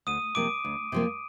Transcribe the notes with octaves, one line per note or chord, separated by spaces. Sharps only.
D2 D#6 D#7
C3 F3 A#3 D6 D7
D2
C3 F3 A#3